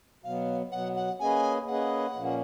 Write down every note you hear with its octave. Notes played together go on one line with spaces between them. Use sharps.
B2 F#3 B3 F5
B2 F#3 B3 F#5
F#5
A#3 C#4 G#4 B4 D#5 G#5
A#3 C#4 G#4 B4 D#5 F#5
A#2 F3 A#3 C#4